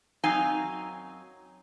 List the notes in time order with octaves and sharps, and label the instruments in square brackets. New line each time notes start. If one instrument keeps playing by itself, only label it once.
[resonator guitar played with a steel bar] F#2 F#3 C4 D#4 F5 G#5